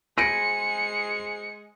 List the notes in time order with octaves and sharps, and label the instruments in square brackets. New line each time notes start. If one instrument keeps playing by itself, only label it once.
[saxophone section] G#3 G#4 [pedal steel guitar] C5 G#5 B5 [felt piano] A#6 D7 [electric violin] C#7